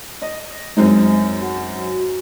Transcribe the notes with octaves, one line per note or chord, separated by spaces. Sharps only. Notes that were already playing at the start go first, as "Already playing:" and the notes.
D#5
F#2 G#3 C4 D#4
F#4